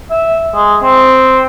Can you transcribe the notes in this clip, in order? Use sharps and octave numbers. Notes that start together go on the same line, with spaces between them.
E5
G#3
C4